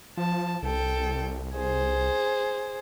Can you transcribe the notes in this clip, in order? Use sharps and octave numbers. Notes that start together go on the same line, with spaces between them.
F3 A5
C2 A4 G5
G#4 C5